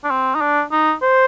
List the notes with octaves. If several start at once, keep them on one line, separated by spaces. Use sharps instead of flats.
D4
C4
D#4
D4
D#4
C5